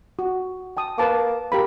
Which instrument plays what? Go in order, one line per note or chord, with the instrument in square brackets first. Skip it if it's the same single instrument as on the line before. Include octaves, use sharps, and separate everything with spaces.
[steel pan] F#4
G5 A5 D#6
[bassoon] A#3 [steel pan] B4 A5 D6
[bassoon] A#3 [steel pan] G4 A#4 B5